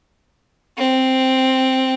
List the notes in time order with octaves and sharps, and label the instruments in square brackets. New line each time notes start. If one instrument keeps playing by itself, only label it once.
[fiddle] C4